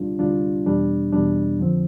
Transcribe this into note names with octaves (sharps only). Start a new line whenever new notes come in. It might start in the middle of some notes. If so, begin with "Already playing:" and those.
Already playing: D2 C3 G3 D4 F4
D2 C3 G3 D4 F4
E2 B2 G3 D4
E2 B2 G3 D4
F2 D3 F3 C4